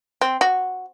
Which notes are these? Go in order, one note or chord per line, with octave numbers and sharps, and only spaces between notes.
C4
F#4